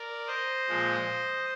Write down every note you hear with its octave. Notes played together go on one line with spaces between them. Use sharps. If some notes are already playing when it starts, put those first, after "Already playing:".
Already playing: A#4 D5
C5 D#5
A#2 F3 G#3